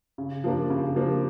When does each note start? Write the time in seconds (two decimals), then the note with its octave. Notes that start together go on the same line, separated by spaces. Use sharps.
0.18 C#3
0.44 F3 A#3 D4
0.70 C#3
0.96 F3 A#3 D4